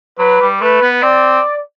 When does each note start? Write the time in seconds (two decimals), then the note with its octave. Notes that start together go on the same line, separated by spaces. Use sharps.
0.19 F#3 B4
0.41 G3
0.61 A3 B4
0.81 B3
1.02 C4 D5